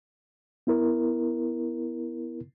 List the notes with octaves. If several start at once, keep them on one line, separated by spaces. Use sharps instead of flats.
B3 E4 A#4